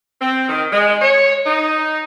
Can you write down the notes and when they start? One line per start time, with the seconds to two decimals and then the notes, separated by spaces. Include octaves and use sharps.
0.20 C4
0.49 D#3
0.72 G#3
1.01 C#5
1.46 D#4